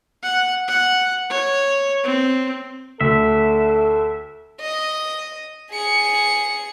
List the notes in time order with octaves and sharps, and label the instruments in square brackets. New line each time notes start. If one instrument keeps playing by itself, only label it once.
[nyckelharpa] F#5
F#5
C#5
C4
[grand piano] D2 [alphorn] A4 [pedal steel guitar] E5
[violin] D#5
G#4 C#7